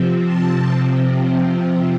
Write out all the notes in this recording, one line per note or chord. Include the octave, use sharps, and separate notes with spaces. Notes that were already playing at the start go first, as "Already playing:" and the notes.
Already playing: C3 F3 C4
A5